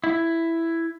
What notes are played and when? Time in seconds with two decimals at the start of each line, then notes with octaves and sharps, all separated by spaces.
0.04 E4